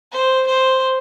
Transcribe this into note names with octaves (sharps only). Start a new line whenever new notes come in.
C5
C5